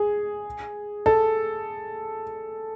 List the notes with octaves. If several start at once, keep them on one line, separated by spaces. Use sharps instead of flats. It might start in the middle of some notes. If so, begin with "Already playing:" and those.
Already playing: G#4
A4